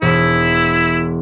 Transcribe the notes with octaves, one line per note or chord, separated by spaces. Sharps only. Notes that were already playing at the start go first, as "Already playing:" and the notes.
E1 E4